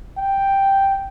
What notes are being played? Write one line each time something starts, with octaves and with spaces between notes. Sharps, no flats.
G5